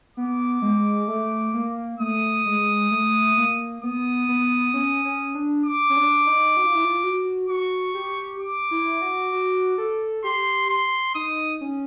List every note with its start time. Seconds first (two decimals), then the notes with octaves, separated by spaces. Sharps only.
0.17 B3 D6
0.62 G#3
1.08 A3
1.54 A#3
2.00 A3 D#6
2.45 G#3
2.91 A3
3.37 A#3
3.83 B3 D#6
4.29 B3
4.74 C#4
5.05 C#4
5.35 D4
5.65 D6
5.90 C#4
5.97 D4
6.27 D#4
6.57 F#4
6.66 F4
6.75 E4
6.85 F4
7.04 F#4
7.49 F#4 C#6
7.95 G4
8.41 D6
8.71 E4
9.02 F#4
9.32 F#4
9.78 A4
10.24 G4 C6
10.70 C6
11.15 D#4 D#6
11.61 C#4